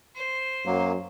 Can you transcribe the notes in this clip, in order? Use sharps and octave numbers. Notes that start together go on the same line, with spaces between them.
C5
F#2 F#3 A#3